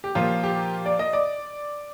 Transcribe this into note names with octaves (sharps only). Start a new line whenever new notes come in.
G4
A#2 F3 A#3 F4
G4
D5
D#5
D5